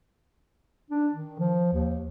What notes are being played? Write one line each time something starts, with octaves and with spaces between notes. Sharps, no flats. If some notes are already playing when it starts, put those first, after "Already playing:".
D4
D#3
F3
D#2